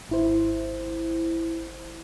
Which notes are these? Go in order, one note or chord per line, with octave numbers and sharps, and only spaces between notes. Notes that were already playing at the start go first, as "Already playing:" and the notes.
G#1 E4 C5